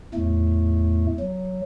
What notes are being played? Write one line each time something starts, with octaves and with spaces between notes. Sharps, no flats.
E2 A2 A3
F#3